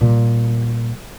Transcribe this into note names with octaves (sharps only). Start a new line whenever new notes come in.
A#2 G3